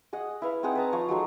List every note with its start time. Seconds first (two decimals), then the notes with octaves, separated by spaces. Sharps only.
0.13 G#4 D#5 F#5
0.42 E4 B4 F5
0.63 C4 D#4 G#4 F#5
0.75 B4 A5 A#5
0.93 F3 C#5 A#5
1.09 F#3 G#3 D#4 A4